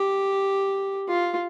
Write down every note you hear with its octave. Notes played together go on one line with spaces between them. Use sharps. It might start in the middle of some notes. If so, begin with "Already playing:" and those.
Already playing: G4
F4